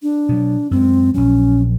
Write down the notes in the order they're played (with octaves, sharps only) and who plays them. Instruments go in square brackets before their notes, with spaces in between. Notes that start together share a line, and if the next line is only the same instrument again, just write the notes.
[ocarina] D4
[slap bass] B2 F#3
[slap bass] F#2 G#3 [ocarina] C4
[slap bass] A#1 F#3 [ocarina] C#4